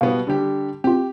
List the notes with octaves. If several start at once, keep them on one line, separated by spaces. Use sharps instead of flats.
B2 G3 B3 F5
D3 G3 G4
C4 F4 G4